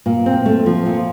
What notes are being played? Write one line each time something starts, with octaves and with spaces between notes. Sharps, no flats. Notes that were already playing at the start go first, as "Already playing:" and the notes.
A#2
C4
A3
F3
A#2